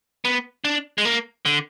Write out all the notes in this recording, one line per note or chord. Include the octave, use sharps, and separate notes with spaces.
B3
D4
G#3
A#3
D3